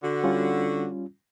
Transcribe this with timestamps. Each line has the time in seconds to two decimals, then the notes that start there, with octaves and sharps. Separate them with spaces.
0.03 D3 F#4
0.24 G3 C#4 F4